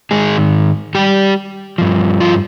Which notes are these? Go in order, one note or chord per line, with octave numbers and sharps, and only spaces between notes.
G#2 D#3 G#3 G#4
G3 G4
G2 F3
F3 F4